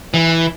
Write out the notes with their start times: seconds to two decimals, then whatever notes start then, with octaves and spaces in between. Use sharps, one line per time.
0.14 E3